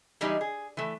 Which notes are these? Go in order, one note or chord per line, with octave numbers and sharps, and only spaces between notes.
E3 G3 G#3 D#4
G#4
E3 A3